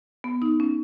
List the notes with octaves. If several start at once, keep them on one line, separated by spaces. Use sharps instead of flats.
B3
D#4
C#4